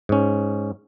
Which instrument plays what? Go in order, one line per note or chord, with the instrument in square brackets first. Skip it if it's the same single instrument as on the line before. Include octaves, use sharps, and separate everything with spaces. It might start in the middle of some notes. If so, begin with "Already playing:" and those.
[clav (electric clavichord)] G#2 C#4